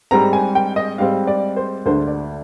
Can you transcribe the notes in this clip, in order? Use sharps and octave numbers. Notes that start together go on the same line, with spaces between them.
G#2 G3 C4 A#5
G#5
G5
D#5
G#2 G3 C4 F5
D5
C5
D2 D3 G#3 D4 C5
D5